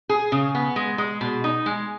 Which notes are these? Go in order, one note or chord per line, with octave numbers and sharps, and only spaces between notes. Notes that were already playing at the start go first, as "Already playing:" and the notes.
G#4
C#3
B3
G#3
G#3
B2
D#4
G#3